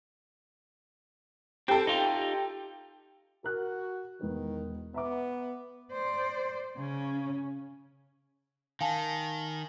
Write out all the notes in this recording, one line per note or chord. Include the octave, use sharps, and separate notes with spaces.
C4 G4 A4
D#4 F4
F#4 A#4 F#6
E1 D#3 B3
B3 E5 A#5 D6
C5 D5
C#3 C#4
D#3 F5 G#5 A5